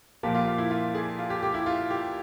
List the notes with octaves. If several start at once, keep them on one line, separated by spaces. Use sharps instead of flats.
A#2 F3 A#3 G4
F4
F4
E4
F4
G#4
F4
G4
G4
E4
F4
G4